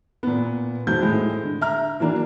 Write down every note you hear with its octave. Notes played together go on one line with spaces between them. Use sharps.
A#2 B3
F2 G#2 F#4 G6
A2 G#3
D3
E5 A#5 F6
E3 F#3 A#3 D4